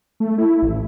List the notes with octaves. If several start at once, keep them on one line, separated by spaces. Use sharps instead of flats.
A3
E4
A1